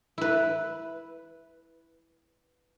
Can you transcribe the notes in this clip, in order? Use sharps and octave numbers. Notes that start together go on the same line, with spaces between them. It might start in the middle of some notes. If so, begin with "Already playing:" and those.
E4 B4